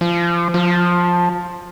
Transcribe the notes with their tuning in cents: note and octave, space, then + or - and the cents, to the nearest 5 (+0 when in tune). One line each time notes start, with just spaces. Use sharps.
F3 -25
F3 +15